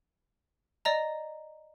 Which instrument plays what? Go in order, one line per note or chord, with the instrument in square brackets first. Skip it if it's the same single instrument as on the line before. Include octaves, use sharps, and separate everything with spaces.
[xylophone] D5 D#5 A#5